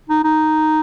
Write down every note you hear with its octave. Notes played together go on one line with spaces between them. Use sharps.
D#4
D#4